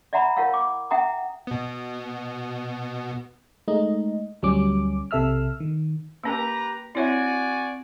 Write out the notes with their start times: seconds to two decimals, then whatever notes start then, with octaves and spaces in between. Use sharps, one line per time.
0.13 D5 E5 F#5 A#5 B5
0.36 E4 A#4 C#5 F5 F#5 E6
0.54 D6
0.91 C#4 E5 F#5 G5 A#5 D#6
1.47 B2 B3
3.68 G#3 A3 D#4 D#5
4.43 D2 F#3 G3 C#4 D6
5.11 B1 C3 A4 E5 E6 F6
5.60 D#3
6.24 A#3 C#4 G4 A#4 B4 A#5
6.95 C4 E4 F#4 C#5 D5 E5 G#5